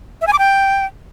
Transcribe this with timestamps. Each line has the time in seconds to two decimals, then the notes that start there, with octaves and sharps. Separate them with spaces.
0.21 E5
0.27 G#5
0.33 D6
0.39 G5